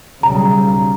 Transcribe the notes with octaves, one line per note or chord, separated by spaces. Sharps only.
B1 C#3 G3 A#5